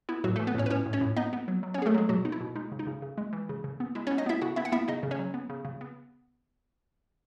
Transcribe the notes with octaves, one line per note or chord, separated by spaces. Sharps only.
B3 E4
A2 F#3 F#4
A3 A4
E3
B3 B4
A2 C#4 C#5
B4
A2 C#4 C#5
A2
C#4 C#5
A2
B3 D#4 D#5
B3
F#3
F#3
C#4 C#5
B3 G#4
A3 A4
F#3 G#3 G#4
B2 F#3 F#4
B3 D#4
E4
B2
G#3 D#4
C#3
D#4
C#3
C#3
G#3
E3
C#3
C#3
B3
G#3 E4
C#4 C#5
B3
D#4 D#5
B3 E4 E5
C#3 F#4 F#5
B3 E4 E5
F#5
B3 E4 E5
C#3 D#4 D#5
C#3
C#4 C#5
F#3
B3
C#3
C#3
B3